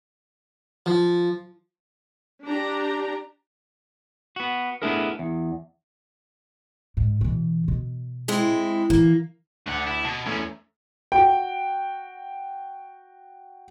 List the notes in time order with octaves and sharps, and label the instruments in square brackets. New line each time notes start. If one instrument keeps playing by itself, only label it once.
[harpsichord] F3
[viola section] D4 G4 A#5
[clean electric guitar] B3 F#4
A3 B3 D4 E4 G#4 A#4
E2
[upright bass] G#2
B2 E3
B2
[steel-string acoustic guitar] G#3 C4 E4
[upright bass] E3 [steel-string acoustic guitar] A#3
[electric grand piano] D2 [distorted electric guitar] D4 F#5
[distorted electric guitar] E4
[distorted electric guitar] B2 [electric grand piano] A5
[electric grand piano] E2 A3 [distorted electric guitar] C#4 E4
[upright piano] F#4 G5